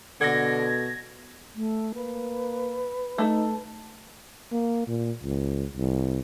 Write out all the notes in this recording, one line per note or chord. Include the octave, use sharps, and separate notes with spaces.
B2 D3 A4 F#5 G#6 A#6
A3
A#3 B4
A3 D#4 A4
A#3
A#2
C#2
C2